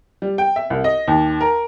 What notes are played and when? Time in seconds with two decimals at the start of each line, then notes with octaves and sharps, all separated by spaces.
0.22 G3
0.38 G5
0.56 E5
0.70 C2
0.84 D#5
1.08 D#2
1.41 A#4